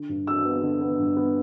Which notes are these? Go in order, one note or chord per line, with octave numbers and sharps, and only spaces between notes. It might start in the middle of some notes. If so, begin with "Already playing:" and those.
Already playing: D3
G2
D3 E6
B3
D3
B3
G2
B3